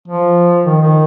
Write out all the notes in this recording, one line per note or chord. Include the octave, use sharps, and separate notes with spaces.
F3
D#3
D#3